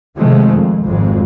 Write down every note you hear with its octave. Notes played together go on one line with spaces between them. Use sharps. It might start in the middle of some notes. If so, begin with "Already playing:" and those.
C3 D#3 F3 G#3 A3
F2
G#1 F2 G#2 G#3